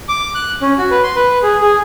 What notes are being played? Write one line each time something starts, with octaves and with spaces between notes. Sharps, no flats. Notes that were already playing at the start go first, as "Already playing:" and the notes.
D6
F#6
C#4
F#4
B4
C6
B4
G#4
G#4